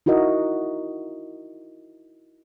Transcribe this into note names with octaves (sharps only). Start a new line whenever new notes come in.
D#4 E4 F#4 A#4 D#5